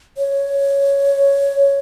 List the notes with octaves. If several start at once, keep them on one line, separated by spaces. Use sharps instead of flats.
C#5